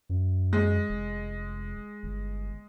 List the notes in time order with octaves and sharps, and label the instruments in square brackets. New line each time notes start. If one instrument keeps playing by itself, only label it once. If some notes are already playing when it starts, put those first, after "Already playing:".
[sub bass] F#2
[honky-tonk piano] G#3
[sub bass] F1
G1